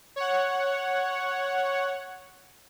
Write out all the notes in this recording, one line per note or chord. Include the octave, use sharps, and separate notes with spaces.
C#5 F#5